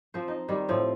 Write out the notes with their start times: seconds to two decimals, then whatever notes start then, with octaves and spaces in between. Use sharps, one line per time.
0.14 F3 C4 C5
0.28 D#4
0.48 D#3 G3
0.68 A2 F3 C4